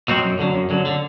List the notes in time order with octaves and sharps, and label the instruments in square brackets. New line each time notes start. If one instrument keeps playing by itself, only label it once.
[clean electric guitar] B2 F#3 C4 F#4
F#2
D3 F#3
F#2
D3 F#3
D3